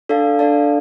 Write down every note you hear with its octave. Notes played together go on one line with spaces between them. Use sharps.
D4 A4 D5 F5 A5
D4 A4 D5 F5 A5